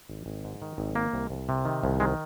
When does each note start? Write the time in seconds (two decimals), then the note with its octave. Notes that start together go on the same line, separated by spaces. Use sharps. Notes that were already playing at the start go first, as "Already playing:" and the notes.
0.10 G#1
0.26 G#1
0.44 G#2
0.62 D#3
0.78 G#1
0.95 D#3 A#3
1.13 C2
1.30 C2
1.49 C3
1.65 D#3
1.84 C2
2.00 D#3 G#3